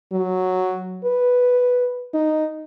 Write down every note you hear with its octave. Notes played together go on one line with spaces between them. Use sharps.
F#3
B4
D#4